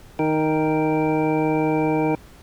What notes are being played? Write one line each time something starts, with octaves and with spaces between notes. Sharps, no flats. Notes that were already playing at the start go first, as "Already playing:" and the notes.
D#3 D#4 A#4 G5